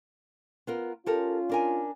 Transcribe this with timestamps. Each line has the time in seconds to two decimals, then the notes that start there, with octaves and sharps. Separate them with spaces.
0.67 B3 F4 A#4
1.06 C#4 F4 G4 A4 A#4
1.50 D4 A#4 G#5